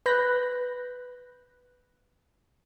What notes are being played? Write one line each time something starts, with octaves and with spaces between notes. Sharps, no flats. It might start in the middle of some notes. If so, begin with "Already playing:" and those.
B4 B5 F#6 G6 A#6